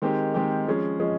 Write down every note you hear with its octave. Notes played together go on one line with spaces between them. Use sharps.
D#3 G#3 C4 G4
D#3 G#3 C4 G4
F3 G#3 C#4 G#4
F3 G#3 C#4 G#4